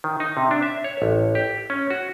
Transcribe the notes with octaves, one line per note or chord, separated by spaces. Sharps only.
D#3
D#4
C3
D4
E5
C#5
A1
G4
C#4
F#4